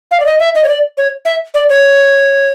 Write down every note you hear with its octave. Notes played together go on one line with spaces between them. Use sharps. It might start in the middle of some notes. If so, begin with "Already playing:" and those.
F5
D5
D#5
E5
D#5
C#5
D5
C#5
E5
D5
C#5